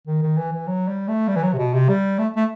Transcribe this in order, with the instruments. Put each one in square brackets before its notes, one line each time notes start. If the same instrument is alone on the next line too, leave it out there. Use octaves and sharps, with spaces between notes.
[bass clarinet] D#3
D#3
E3
E3
F#3
G3
A3
G3
E3
F#3
C3
B2
C3
G3
A3
A3